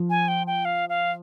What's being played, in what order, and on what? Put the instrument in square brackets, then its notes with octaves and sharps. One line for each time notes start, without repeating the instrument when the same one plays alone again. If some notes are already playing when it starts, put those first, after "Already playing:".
Already playing: [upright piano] F3
[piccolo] G#5
G5
G5
F5
F5